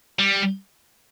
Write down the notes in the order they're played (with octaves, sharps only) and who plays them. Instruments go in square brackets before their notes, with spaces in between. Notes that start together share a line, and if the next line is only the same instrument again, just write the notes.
[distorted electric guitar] G3